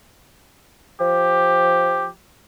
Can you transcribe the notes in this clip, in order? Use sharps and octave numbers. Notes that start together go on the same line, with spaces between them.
F3 G4